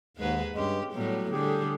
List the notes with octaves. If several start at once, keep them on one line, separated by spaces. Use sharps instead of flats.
D#2 G#2 G#3 G#4 B4
G2 G#3 C#4 G4
A2 F#3 G3 B3
D3 G3 G4 G#4